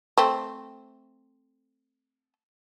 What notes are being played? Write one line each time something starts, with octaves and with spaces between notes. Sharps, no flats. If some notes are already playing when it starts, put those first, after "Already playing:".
A3 C4